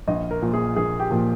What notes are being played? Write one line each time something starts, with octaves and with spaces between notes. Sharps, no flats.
A#1 D#5
A#4
A#2 F3
G#4
A#1 G#4
G4
A#2 F3